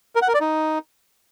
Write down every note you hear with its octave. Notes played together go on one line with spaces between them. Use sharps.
A#4
F#5
A#4
D5
D#4